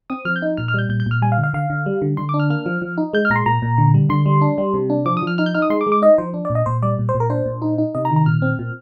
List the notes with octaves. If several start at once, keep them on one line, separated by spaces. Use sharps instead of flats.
C4 D#6
F3 F6
G6
D#4
A#2 F6
F6
G3 G6
A#2 G6
G6
A#2 F6
G3 G#5
F5
D3
F5
D3 F5
D3
G3
D3
D3 C6
D6
D4
F6
A#3 F6
F3
F3
D#4
G#3 G6
F6
A#2 A#5
C6
A#2 A#5
A#2
D3
G3
D3 C6
G3
D4
G3
C3
D4
F3 D6
D#6
F3 F6
D#4 F6
G6
D#4 F6
D#6
G#3 C6
D6
G#3
D6
D#4 D#5
F3 C5
D4
D5
A#2
D#5
A#2 C5
G3 D5
A#2
C5
A#2
A#4
D4 C5
A#2
D#4
D#4
C3 D#5
A#5
D#3
A#5
A#2 F6
C4
A#2